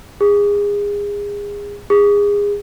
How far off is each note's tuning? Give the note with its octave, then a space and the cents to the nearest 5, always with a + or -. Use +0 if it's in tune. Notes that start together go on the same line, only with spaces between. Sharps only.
G#4 -30
G#4 -30